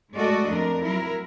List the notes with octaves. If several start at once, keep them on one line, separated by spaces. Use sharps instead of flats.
G#3 A3 F#4 A4 D5 D#5
F2 D4 A#4
F#3 E4 A#4